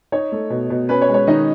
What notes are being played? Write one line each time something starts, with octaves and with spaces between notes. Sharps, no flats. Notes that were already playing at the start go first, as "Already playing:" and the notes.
D#4 C#5
A3
B2
B2
C#4 B4
C#5
G#3
C#5
D#3 D#4 D#5